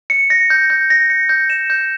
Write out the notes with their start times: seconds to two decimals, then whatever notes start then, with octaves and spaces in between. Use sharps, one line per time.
0.10 C#7
0.30 A#6
0.50 G6
0.70 G6
0.90 A#6
1.10 C#7
1.29 G6
1.50 E7
1.70 G6